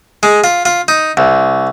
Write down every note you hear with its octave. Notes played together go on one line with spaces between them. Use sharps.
G#3
F4
F4
D#4
C2